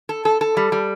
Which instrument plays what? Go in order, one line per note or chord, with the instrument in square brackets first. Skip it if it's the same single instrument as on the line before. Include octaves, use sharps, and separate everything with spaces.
[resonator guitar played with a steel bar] A4
A4
A4
G3
G3